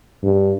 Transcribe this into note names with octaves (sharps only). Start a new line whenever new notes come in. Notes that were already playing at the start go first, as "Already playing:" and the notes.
G2